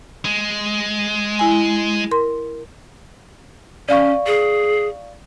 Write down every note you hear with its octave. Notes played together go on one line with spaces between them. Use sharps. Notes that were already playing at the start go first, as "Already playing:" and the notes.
G#3
E4 G#5
A#4 C6
C#4 D5 F5 C#6
G#4